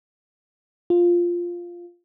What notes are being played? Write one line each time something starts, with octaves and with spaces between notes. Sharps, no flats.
F4